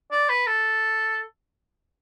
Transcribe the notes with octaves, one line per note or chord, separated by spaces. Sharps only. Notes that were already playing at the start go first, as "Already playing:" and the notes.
D5
B4
A4